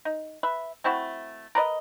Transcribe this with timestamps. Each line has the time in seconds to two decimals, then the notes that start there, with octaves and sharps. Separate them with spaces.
0.05 D#4
0.43 B4 E5
0.84 A3 C4 E4 F#4
1.55 A#4 B4 D5 D#5